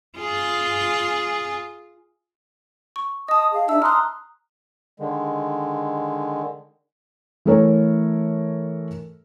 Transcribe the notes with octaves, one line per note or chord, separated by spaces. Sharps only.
F4 G#4
C#6
D#5 A5 D#6
G#4 F5
D4 D#4 E5 A5 E6
A#5 C6 D#6 F6 F#6
D3 D#3 G#3
E3 A3 A4 A#4 C#5